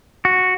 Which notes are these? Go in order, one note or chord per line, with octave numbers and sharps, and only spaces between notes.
F#4